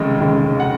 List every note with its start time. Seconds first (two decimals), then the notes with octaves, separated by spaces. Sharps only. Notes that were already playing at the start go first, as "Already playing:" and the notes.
Already playing: F1 D#2 C#3 G#3 D#5
0.20 F1 D#2 C#3 G#3
0.60 F#5